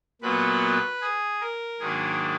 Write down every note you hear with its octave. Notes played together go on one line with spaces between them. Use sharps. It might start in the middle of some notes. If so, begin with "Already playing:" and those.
A#2 F#3 B3 B4
G#4
A#4
G#2 D#3 F#3 A#3 D4 G#4